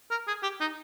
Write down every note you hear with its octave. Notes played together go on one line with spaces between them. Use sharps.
A#4
G#4
G4
D#4